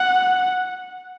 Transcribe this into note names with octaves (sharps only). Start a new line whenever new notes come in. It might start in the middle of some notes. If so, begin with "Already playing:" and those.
Already playing: F#5